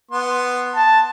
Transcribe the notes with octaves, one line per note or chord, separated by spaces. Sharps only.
B3 C6
A5